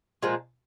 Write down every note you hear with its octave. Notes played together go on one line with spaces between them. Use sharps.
A#2 F3 G#3